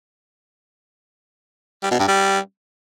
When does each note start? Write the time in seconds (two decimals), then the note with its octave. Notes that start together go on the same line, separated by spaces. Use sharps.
1.83 G3
1.91 B2
2.00 G2
2.08 G3